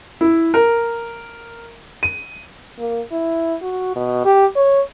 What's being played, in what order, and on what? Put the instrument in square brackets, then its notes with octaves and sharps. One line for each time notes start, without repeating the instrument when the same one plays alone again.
[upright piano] E4
A#4
D#7
[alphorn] A#3
E4
F#4
B2
G4
C#5